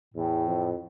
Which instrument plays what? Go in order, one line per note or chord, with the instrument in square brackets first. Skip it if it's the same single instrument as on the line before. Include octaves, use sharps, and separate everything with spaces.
[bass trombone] E2 [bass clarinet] A2
[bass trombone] F2